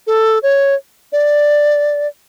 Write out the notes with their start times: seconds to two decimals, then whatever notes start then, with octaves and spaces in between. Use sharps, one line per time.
0.07 A4
0.43 C#5
1.13 D5